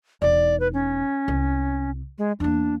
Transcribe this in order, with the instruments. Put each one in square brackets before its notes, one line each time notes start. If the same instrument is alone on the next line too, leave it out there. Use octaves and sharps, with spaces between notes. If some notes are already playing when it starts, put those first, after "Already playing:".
[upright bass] E1 D#4 [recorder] D5
[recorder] B4
C#4
[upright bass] C2
[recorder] G#3
[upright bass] E2 A#3 [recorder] D4